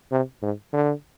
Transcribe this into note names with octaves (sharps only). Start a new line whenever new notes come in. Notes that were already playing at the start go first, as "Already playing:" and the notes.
C3
G#2
D3